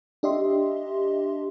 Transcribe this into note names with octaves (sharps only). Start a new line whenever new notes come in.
D4 G4 D#5 E5 C6